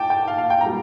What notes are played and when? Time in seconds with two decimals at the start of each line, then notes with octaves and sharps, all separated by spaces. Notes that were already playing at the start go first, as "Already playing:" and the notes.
Already playing: A#2 G5 A5 D6
0.10 G5
0.28 F5
0.38 F5
0.50 G5
0.61 A#2 G3 A#5